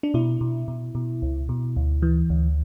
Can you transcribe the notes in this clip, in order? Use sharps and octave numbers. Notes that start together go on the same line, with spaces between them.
D4
B2 E4
B2
B2
B2
C#2
B2
D2
E3
D2